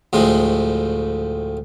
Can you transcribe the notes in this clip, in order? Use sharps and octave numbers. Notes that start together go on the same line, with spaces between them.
D2 A2 F3 G#3